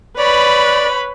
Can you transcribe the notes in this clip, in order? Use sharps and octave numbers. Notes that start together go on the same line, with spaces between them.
B4 C#5 D5 B5